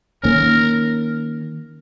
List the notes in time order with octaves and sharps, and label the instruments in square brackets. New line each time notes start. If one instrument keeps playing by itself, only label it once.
[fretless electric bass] D#3 A#3 C#4 [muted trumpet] A#4